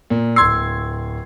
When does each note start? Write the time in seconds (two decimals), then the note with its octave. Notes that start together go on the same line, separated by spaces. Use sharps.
0.10 A#2
0.36 D1 C6 E6 G#6 C7